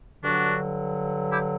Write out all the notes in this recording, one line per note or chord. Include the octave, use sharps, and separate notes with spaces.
G2 D3 F#3 D4 F#4
E4 G4